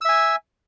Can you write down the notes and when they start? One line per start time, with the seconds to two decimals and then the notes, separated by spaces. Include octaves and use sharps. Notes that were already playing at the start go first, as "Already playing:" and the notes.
0.01 E6
0.05 E5
0.09 G#5